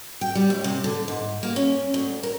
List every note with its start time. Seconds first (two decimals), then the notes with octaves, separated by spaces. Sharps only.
0.21 G5
0.35 G3
0.50 D#2
0.64 C3
0.84 D3
1.08 G#2
1.43 A#3
1.56 C#4
1.94 D2
2.23 A#4